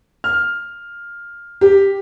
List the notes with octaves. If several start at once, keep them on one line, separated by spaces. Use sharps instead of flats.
F6
G4